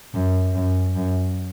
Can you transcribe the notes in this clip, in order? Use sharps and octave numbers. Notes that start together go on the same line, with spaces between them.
F#2
F#2
F#2